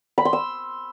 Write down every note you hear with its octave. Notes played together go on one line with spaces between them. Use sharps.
B5
C6
E6